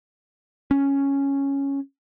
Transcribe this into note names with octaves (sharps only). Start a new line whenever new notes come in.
C#4